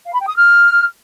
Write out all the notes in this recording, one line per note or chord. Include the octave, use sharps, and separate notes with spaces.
F5
B5
G5
D#6
F6